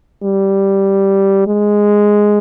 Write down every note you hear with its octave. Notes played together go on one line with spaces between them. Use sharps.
G3
G#3